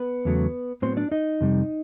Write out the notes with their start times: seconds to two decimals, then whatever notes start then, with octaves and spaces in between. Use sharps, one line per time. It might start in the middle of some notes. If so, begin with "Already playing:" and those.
Already playing: B3 B4
0.25 E2 C#3 F#3 A3
0.82 A2 F#3 B3 C4 C5
0.97 D4 D5
1.11 D#4 D#5
1.41 F2 C3 G3